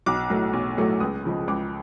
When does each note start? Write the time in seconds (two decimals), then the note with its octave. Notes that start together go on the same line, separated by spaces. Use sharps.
0.06 B1 D6
0.30 A2 F#3 A3
0.53 B1
0.77 A2 F#3 A3
1.00 C#2 D#6
1.25 C#3 F3 G#3
1.48 C#2 D6